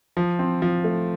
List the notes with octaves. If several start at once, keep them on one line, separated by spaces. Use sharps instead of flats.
F3
C4
F3
A3